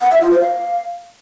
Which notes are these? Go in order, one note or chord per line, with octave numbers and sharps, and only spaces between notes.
F#5
E5
F4
C5
F5